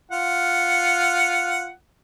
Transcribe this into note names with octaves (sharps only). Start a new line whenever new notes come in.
F4 F#5